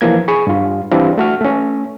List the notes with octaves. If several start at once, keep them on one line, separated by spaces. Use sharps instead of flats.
E3 F3 A#3 G#6
G#4 B5 C#6
G2 F4
E3 G3 C4 D4 E4 F4
A3 F#4 F6
A3 C#4